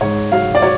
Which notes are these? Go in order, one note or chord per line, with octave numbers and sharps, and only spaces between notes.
G#2 C#5
F#3 F5
D5
F#3 C#5